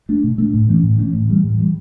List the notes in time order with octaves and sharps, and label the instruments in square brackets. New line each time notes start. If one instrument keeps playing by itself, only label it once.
[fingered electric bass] A3 D4
B2
A3 D4
A2
E3 A3 C#4
A2
E3 A3 C#4
A2
E3 G3
A2
E3 G3